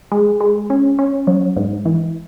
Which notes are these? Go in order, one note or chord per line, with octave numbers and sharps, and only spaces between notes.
G#3
G#3
C#4
C#4
F#3
G#2
E3